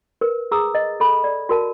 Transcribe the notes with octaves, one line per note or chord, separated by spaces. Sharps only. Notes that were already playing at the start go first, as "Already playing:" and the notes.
A#4 B4
G#4 A#5 D#6 E6
D#5
A4 B5
D5
F#4 A#4 A5